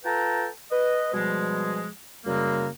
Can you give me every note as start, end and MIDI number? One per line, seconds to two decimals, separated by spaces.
0.04 0.46 65
0.04 0.46 69
0.04 0.46 71
0.04 0.46 79
0.04 0.46 81
0.04 0.46 82
0.71 1.12 71
0.71 1.12 75
1.13 1.86 47
1.13 1.86 53
1.13 1.86 55
1.13 1.86 56
2.25 2.67 42
2.25 2.67 49
2.25 2.67 55
2.25 2.67 56
2.25 2.67 58